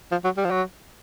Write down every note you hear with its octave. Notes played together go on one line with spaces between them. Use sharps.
F3
F#3
G3
F3
F#3